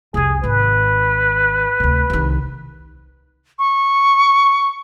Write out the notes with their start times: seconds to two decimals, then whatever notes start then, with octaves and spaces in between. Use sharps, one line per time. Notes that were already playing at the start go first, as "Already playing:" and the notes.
0.14 C2 F2 G#4
0.44 G#1 D#3 B4
1.80 D2 C3
2.10 C2 D#3
3.59 C#6